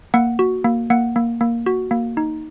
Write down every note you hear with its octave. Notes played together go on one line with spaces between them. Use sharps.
A#3 F#5
F#4
A#3
A#3 F#5
A#3
A#3
F#4
A#3
D#4